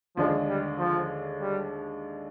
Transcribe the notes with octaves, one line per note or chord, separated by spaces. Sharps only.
D#2 D3 F3 G#3 D4 G#4
G3
F3
G3